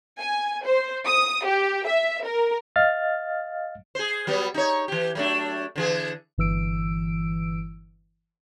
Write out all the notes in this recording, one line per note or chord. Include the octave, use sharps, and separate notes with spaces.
G#5
C5
D#6
G4
E5
A#4
D#5 F5 F6 A6
G#4 C5
F#3 G3 B3
D#4 C#5
E3 G4
F#3 A3 D4
D3 E3 G#4
G1 E3 E6 D7